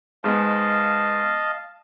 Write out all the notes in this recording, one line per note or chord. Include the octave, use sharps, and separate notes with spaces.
G#2 G#3 B3 D#5 F5 A5